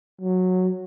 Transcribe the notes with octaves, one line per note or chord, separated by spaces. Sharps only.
F#3